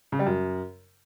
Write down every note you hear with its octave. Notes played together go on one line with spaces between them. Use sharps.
C#3
G3
F#2